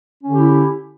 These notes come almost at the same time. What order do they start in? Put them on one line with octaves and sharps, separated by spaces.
C#4 D3 G4 E4